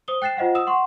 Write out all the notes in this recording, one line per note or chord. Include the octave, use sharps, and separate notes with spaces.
C5 D#6 G7
G5 F#6 A6 C7 E7
F4 C5 D#5 F5 F#5
D#6 E6 E7
F#5 C6 C#6